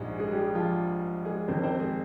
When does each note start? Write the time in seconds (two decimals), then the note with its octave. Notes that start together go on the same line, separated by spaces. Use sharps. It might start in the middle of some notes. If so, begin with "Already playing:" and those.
Already playing: A#1 G#2 G3 G#3 G#4
0.19 G#3 G#4
0.31 G3 G4
0.55 F3 F4
1.25 G#3 G#4
1.48 F2 D#3 G3 C4 C5
1.63 C4 C5
1.79 G#3 G#4